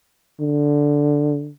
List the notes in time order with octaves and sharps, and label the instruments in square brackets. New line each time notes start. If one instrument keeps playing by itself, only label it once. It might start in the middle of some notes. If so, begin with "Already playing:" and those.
[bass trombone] D3